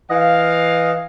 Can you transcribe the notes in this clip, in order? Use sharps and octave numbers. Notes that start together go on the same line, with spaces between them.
E3 D#5 F5